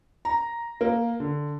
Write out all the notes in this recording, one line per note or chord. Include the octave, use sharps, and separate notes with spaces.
A#5
A#3
D3